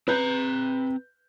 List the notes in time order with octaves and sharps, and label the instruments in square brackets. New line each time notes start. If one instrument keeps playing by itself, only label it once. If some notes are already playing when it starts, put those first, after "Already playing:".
[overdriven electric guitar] C4 A#5 [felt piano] B4 G6